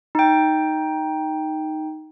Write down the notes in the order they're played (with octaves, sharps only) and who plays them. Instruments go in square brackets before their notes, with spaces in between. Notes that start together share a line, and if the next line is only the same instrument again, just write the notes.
[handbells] D#4 G5